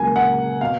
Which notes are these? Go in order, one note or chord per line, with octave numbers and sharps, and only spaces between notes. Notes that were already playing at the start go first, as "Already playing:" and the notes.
Already playing: C#2 C#3 F#3 A#3 G#5
F#5
B2 F5